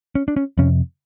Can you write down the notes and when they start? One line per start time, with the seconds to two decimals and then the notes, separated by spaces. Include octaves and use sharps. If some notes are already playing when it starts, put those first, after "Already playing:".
0.15 C#4
0.28 D4
0.37 C#4
0.58 F2 C3 C#4